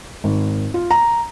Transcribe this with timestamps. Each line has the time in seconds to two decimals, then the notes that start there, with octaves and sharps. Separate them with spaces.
0.24 G#1
0.74 F4
0.91 A#5